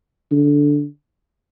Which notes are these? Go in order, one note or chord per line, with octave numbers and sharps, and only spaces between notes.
D3